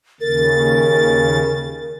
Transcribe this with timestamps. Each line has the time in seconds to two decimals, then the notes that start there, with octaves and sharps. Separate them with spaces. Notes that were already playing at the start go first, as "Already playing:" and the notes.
0.21 D#2 C#3 A#4 A6